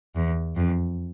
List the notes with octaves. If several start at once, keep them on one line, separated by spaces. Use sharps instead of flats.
E2
F2